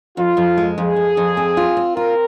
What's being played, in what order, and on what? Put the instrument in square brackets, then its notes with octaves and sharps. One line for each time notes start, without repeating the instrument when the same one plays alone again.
[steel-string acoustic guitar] F2 [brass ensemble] F4
[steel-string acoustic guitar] F2
G#3
[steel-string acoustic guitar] F2 [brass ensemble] G#4
[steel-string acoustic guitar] F2
F2
C4
F4
C4
[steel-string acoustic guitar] F4 [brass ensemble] A#4